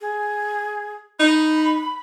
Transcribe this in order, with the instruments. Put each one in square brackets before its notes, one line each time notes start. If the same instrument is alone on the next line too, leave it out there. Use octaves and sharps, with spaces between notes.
[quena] G#4
[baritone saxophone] D#4 [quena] B5